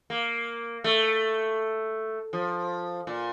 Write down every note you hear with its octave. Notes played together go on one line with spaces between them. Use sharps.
A#3
A3
F3
A#2